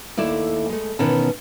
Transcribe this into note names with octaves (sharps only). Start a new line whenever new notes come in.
D#2 A3 E4 D5
G#3 A3
B2 D#3 E3 B3 C#4 A5